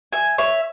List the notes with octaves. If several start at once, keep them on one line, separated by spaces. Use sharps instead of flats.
E5 G#5
C#5 E5